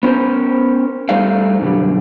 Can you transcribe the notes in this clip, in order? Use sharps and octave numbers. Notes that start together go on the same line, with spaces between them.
B3 C#4 A#4 C5
G3 A3 D#4 C5 D5 F5
F#2 B2 D3 G3